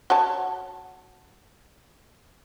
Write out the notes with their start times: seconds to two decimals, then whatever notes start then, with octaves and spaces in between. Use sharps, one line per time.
0.10 F#4 C#5 A5